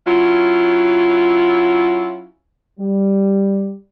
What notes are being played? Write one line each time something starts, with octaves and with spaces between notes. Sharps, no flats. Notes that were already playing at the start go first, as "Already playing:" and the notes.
F#3 C#4 E4 F4
G3